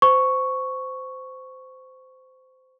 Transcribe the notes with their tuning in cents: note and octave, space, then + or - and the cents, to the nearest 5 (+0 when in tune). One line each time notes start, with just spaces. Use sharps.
C5 -20 C#6 +0